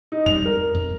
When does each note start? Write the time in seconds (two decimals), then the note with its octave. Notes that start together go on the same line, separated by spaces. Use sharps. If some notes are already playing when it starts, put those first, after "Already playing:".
0.12 D#4
0.26 F2 G3 F7
0.45 A#4
0.75 F2